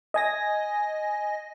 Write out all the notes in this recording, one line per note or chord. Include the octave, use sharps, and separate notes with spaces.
D#5 G#5 A#6